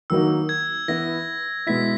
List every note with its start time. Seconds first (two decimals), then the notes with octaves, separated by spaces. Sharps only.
0.10 D#3 F#3 A#3 D#4 F#4 E6
0.49 G#6
0.88 E3 B3 E4 A#6
1.67 B2 G#3 B3 E4 B6